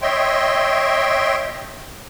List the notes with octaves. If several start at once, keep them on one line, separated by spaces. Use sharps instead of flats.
C#5 D#5 E5 G5 C6